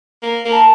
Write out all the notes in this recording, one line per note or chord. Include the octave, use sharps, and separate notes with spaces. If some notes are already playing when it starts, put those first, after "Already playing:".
A#3
A#3
A5